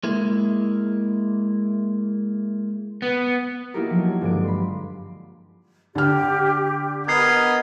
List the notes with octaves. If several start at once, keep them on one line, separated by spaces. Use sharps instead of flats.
G#3 A#3 E4
B3
A#3 D#4 E4 F#4 G4 A#4
F3 F#3
G#6
G2 D3 F3 G#3 D5 D7
B5 C6
D3 G4 F6
B3 A#4 D#5 G#6 C7